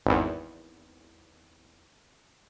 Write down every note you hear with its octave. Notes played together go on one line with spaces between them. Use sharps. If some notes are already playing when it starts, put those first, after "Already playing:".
G#1 E2